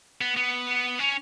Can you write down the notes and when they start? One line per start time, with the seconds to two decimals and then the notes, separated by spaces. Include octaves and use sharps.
0.21 B3
0.37 B3
0.99 C#4